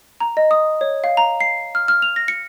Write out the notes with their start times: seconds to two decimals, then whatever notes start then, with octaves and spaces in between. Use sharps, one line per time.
0.21 A#5
0.37 D#5
0.51 D#6
0.81 C#5
1.04 F5
1.17 A#5
1.40 C7
1.75 F6
1.88 F6
2.02 F7
2.16 A#6
2.28 C#7